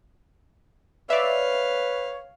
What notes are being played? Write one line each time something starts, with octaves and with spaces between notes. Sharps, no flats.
B4 C#5 D5 E5 F5